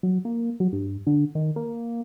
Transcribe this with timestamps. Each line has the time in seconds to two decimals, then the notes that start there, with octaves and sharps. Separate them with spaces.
0.03 F#3
0.25 A#3
0.60 F#3
0.72 G2
1.06 D3
1.35 D#3
1.56 A#3